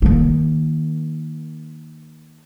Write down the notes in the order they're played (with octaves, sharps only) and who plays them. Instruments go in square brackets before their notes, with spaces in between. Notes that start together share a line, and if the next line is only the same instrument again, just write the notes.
[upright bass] D#3 A#3